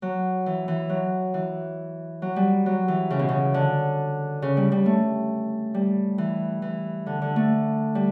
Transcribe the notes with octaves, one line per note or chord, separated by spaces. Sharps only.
F#3
E3
E3
F#3
E3
F#3
G3
F#3
E3
C#3
B2
C#3
D3
C#3
G3
G3
A3
G3
E3
E3
D3
D3
A3
G3